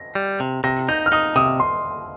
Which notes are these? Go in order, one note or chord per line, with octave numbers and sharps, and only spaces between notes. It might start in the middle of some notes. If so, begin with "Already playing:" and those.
Already playing: A#6
G3
C3
C3 A#6
D#4 G6
F6
D#4 D#6
C3 D#6
C6